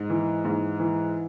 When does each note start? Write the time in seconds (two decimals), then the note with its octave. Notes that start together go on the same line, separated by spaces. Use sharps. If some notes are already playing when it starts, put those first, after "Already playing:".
Already playing: G#2
0.10 E3
0.45 G#2
0.80 E3